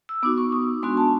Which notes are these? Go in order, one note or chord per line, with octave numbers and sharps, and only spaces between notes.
E6
B3 D#4 F#4 D6
C#6
D#6
G#3 B3 D4 F#4 C6
A5